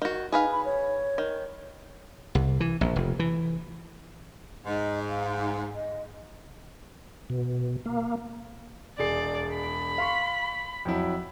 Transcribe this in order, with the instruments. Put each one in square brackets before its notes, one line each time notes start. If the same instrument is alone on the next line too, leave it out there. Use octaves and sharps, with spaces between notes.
[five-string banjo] D#3 F#4
[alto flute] D#4 [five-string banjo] G#4 B4 F5
[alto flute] B5
C#5
[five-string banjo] D#3
[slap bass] C2
E3
A#1
F1
E3
[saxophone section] G#2 [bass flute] D#5
[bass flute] F5
D#5
[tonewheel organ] B2
A#3
[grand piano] E1 G#4 C7 [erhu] D5
[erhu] B5
[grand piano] F5 C6 C#6
F2 F#3 E4